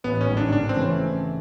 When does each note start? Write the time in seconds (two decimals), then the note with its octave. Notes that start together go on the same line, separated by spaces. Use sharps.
0.04 A1 B3
0.21 C#4
0.28 G#2 D#3
0.37 D4
0.52 C#3 D4
0.69 C4
0.76 E3 A3 C#4